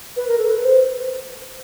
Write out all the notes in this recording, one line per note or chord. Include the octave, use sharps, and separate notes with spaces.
B4
A#4
A4
B4
C5